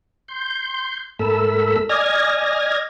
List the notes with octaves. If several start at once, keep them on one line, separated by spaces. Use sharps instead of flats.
C6 G6
G#2 A3 A4 A#4 B5 E6
D5 D#5 G#5 F6 G#6 A#6